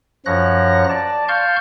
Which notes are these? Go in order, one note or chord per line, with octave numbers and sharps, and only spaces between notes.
F#2 F3 C#5 F#6 A#6
D5 A5
F5 A5 C6 C#6 F6 G6